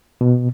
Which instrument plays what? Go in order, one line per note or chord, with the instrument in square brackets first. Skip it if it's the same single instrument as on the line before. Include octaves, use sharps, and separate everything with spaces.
[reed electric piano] B2